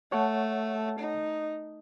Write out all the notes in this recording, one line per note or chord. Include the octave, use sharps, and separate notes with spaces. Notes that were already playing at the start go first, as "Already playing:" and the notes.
A3 C#5 F#5 A5
D#4